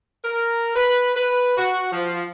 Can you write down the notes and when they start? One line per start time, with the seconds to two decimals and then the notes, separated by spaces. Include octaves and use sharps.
0.25 A#4
0.76 B4
1.15 B4
1.57 F#4
1.92 F3